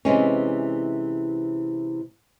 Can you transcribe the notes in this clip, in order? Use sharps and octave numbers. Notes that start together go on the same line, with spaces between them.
C3 E3 G#3 C#4